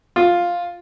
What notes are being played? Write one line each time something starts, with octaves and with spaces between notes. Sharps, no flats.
F4